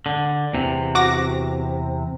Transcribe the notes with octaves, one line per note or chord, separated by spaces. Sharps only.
D3
E2 C3
F#4 D6 A#6